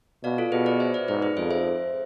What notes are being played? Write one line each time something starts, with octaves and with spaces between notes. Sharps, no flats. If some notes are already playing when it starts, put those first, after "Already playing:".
B2 D5 F5
F4 A4
B2 G#4 B4
B4 D5
C5 E5
B4 D5
G#2 B4 D5
G#4 B4
F2 A4 C5
C5 E5